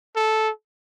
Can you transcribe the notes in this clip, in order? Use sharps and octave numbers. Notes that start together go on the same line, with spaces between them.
A4